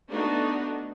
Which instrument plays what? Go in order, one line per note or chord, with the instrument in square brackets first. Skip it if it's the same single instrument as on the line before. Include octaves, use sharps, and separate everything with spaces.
[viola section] A3 B3 D4 D#4 F#4